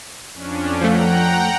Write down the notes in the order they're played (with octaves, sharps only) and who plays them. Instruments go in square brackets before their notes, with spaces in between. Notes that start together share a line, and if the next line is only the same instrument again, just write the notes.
[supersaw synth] F2 C#4 D4
[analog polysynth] F3 A3 [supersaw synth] F#5 G5 A#5